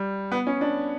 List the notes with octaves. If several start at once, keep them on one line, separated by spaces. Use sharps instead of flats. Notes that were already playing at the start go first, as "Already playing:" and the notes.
Already playing: G3
B3
C#4
D4